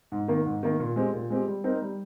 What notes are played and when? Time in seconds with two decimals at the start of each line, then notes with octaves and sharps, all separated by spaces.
0.12 G#2
0.28 D#3 A#3
0.46 G#2
0.63 D#3 A#3
0.80 A#2
0.96 G#3 C4 G4
1.13 A#2
1.30 G#3 C4 G4
1.48 G3
1.64 C4 D#4 A#4
1.82 G3